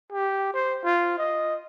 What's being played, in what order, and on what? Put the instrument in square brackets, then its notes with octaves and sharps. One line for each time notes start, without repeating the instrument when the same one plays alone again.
[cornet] G4
C5
F4
D#5